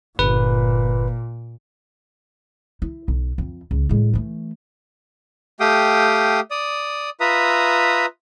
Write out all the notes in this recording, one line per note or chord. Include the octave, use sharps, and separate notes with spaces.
G1 A#2 B4
E4
B1
F2
C#2
A2 G#3
E3 A3
A3 G4 F5 G5 D#6
D5 D#6
F4 B4 E5 A#5 D#6